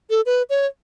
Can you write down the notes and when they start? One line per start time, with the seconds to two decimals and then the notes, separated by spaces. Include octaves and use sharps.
0.10 A4
0.26 B4
0.50 C#5